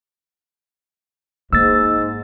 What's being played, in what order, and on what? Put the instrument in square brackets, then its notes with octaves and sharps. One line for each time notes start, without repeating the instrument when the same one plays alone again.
[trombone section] G#2 [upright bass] A#3 [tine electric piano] E6 A6